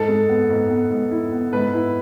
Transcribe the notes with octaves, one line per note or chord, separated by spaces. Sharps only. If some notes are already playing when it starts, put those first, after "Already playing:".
Already playing: G#2 A4
G#3
B3
G#2
B3
G#2
E4
B3
G#2 B4
E4